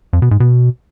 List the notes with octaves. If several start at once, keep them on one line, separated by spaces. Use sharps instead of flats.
F2
B2
G#2
B2